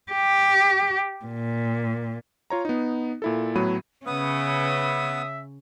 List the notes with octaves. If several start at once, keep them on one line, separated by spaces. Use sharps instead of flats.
G4
A#2
F4 C#5 A#5
B3 D#4
A#2 E4 A4
A2 F#3 A3 B3 B5 D#7
C#3 B3 C#4 B4 E5 D#6